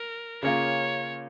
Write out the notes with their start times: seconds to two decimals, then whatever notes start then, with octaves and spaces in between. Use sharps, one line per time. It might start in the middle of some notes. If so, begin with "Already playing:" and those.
Already playing: A#4
0.43 C#3 A#3 C#4 F4 C#5